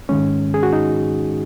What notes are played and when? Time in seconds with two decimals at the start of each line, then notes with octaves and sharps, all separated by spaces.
0.09 G#2 D#3 G#3 C#4
0.54 G#4
0.63 F#4
0.73 D#4